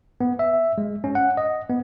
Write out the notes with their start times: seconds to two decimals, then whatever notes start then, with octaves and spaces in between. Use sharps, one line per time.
0.21 B3
0.39 E5
0.78 G#3
1.04 C#4
1.15 F#5
1.37 D#5
1.70 B3